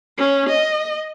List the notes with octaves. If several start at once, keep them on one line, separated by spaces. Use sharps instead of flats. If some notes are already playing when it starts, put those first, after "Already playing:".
C#4
D#5